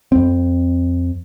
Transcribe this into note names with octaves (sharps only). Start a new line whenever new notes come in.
F2 C4